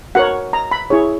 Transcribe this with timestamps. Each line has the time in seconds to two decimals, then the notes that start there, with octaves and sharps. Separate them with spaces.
0.15 F#4 A#4 C#5 F#5
0.53 A#5
0.71 B5
0.90 E4 G#4 C#5